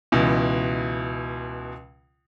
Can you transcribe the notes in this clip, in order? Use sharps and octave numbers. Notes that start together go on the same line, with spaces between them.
C#2 B2 E3